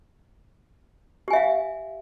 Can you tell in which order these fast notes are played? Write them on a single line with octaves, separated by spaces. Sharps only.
G4 G#5 E5 F5